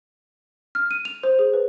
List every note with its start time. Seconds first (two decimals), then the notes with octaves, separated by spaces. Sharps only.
0.75 F6
0.91 D#7
1.05 F7
1.23 C5
1.39 G#4
1.53 B4